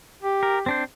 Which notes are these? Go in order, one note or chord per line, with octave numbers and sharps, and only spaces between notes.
G4
A#4
C4 D4 C5